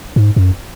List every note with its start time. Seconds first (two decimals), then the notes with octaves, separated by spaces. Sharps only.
0.16 G#2
0.36 F#2